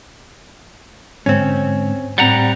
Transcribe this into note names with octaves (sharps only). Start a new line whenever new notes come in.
G#2 D3 G#3 C4 C#4
A2 G3 C4 F#5 A#5